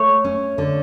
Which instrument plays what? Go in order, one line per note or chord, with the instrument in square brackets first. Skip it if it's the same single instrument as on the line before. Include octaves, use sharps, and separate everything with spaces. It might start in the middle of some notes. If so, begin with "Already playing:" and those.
Already playing: [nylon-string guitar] A3 [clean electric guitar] C#5
[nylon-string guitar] C#4
D3